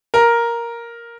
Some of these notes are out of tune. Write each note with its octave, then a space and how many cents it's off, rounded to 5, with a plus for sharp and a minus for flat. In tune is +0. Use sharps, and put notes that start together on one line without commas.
A#4 +5